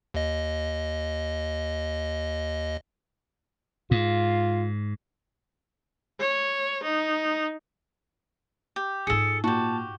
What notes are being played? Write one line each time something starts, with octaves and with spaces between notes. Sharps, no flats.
D#2 D#5
G#2 F4
C#5
D#4
G4
G#2 F4 G#4 A4 C#7
A#2 F#4 G4 A5